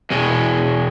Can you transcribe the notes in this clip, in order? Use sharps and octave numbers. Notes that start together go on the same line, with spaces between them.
E2 B2 G#3